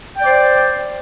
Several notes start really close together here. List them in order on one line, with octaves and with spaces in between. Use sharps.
G5 D5 C5